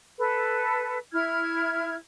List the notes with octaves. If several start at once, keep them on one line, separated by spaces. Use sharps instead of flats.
A4 B4
E4 F6 G#6